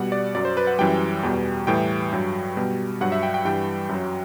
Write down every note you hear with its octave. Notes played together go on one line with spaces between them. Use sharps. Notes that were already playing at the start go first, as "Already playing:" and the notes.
Already playing: B2 G3 F#5
D5
F#2 F#3 D5
C5
B4
F#5
F#2 E3 G3 G5
E2 B2 G3
A2 E3 G3 G5
G2 F#3
B2 G3
G2 F#3 F#5
E5
G5
G5
G2 E3 G3 G5
F#2 F#3